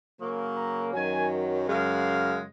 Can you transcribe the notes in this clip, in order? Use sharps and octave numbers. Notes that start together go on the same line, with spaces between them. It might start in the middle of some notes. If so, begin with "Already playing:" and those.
C#3 F#3 A#3
A#5
F#2 D#3 F#3 G#5
F#2 C#3 G#3 F5